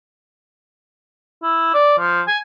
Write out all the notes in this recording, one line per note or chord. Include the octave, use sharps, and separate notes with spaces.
E4
D5
F3
G#5